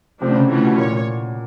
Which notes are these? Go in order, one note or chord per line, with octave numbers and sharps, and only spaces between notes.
C3 F3 A3 D4
D3
C#3
D3 E3 A3 C#4 F4
B2
A#2 C#5
A#2